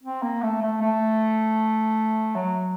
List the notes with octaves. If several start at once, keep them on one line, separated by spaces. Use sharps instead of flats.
C4
A#3
A3
A3
A3
F#3